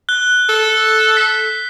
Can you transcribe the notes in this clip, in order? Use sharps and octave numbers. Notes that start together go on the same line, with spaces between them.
F#6 G7
A4
B6